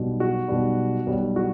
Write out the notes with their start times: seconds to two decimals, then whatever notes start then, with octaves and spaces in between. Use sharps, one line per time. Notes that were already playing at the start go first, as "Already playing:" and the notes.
Already playing: B1 B2 G3
0.20 F#4
0.48 B1 B2 G3
1.07 B1 B2 G3
1.36 F#4